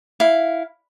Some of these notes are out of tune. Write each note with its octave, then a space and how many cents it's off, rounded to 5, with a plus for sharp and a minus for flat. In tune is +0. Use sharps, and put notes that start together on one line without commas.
E4 +0 F5 +0